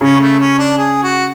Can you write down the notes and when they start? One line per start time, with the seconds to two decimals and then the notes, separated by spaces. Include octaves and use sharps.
0.01 C#3 C#4
0.20 A3
0.40 C#4
0.58 D4
0.78 G#4
1.03 F#4